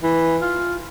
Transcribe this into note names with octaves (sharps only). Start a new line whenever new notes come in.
E3
F4